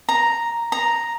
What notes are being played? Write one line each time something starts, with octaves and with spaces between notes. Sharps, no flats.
A#5
A#5